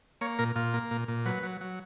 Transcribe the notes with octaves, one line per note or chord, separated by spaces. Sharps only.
A#3 C#5
A#2 A#4
A#2 F4
A#3
A#2
A#2
F#3 B4
F#3
F#3